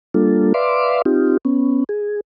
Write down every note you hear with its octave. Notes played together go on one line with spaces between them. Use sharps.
G3 A#3 D4 F4 A4
B4 D5 E5 F5 C6 D6
C4 D#4 F4 G4
B3 C#4
G#4